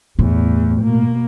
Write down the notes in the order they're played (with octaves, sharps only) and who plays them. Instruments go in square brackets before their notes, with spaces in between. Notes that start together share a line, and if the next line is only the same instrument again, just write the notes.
[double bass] G1 E2 [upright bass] A2
[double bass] B2 A#3